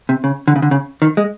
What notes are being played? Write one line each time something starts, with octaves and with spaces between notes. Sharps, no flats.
C3
C#3
D3
C#3
D3
C#3
D#3
G#3